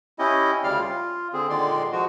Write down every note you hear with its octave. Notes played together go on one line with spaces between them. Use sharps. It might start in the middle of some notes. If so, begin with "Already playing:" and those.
C#4 E4 G4 D#5
D2 C#3 G3 D5 F5 F6
F4
D3 C4 G#4
A#2 D3 D#3 G#3 D5 C6
F3 G#3 F#4